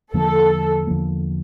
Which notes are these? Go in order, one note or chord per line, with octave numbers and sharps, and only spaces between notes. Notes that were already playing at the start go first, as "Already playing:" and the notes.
E2 D3 F3 A#3 A4
E2 D3 F3 A#3